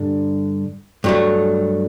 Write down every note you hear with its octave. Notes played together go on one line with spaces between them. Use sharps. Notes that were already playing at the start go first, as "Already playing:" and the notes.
Already playing: G2 D3 G3
G2 F#3 A3